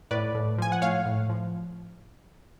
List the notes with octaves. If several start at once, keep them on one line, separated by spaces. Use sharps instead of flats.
A2 B4 D5
A2
F3 G#5
F#5
A2 C#5 F5
A2
F3